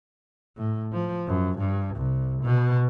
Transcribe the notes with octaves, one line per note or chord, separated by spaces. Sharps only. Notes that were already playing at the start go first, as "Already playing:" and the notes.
A2
F3
F#2
G2
C2
B2